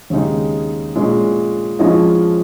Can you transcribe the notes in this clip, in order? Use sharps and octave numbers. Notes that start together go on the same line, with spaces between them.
D#2 C#3 G#3 D#4
A#2 G#3 C#4
F2 F3 G#3 C#4 F4 D#5